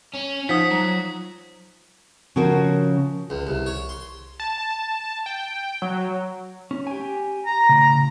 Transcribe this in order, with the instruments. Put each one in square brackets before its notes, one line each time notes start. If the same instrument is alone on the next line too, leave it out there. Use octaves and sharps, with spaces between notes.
[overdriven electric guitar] C#4
[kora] F3 [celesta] D#4 [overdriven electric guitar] F#5 [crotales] D#6 B6
[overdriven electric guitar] F#3 [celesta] A#5
[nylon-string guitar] C#3 F3 C#4 F#4 A#4
[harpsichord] C#2
C2
C#5
C6
[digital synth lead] A5
A5
G5
F#3
[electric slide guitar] C#4
G4 G#5
[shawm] A#5
[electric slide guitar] A2 C#3